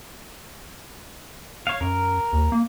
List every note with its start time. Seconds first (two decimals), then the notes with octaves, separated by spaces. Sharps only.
1.67 C#5 F5
1.81 F#2 A#4
2.32 D#2
2.52 A#3